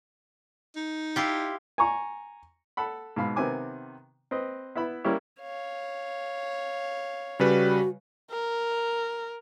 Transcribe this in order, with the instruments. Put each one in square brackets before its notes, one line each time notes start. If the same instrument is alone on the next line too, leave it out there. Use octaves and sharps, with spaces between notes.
[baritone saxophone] D#4
[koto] E4 F4 G4
[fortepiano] G#5 A#5 C#6
A4 F#5 B5
G#2 B2 F5 B5
C3 D#3 B3 C4 G#5 D6
C4 B4 D#5
B3 E4 E5 B5
G3 A#3 C#4 E4 G4 C#5
[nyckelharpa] C#5 F5
[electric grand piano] C#3 G3 B4 [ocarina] F#4
[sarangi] A#4